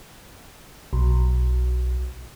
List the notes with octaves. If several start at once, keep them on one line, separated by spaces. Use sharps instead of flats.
B1